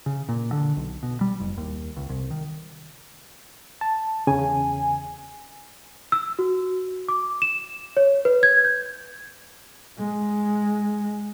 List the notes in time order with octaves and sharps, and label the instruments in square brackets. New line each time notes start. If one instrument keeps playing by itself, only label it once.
[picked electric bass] C#3
A#2
D3
B1
B2
G3
F#1
D#2
C#2
C2
D#3
[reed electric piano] A5
[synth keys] E2 G#5 [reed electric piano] C#3
[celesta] E6
F#4
D6
E7
C#5
B4
G#6
G6
[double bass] G#3